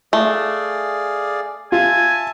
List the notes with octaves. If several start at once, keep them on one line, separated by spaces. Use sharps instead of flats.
A3 G#4 D5 F5
F4 E5 G#5 A5